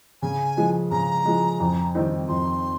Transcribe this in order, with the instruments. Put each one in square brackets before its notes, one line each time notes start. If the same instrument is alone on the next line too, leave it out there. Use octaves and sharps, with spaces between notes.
[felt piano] C#3 [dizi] G#5
[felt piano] F3 G#3
[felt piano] C#3 [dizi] A#5
[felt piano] F3 G#3
F2
D#3 G3 C4 D#4
[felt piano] F2 [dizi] C6